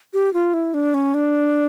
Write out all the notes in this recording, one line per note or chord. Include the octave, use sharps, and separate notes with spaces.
G4
F4
E4
D4
C#4
D4